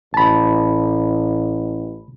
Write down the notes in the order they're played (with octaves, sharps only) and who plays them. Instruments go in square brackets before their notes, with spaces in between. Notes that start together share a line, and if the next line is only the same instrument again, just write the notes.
[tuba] A1 [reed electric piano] A5 B5